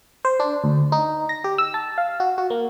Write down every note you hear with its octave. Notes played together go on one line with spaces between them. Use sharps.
C5
D4
D2
D#4
A#6
G4
E6
A5
F5
F#4
F#4
A#3